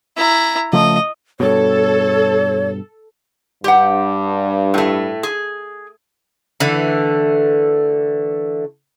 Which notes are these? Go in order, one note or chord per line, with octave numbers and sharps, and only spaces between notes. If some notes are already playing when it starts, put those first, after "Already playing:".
E4 A#5
C#3 F3 A3 D#5
G2 B2 A4 C#5
G2 G4 F#5
A2 A3
G#4
D3 E3 A3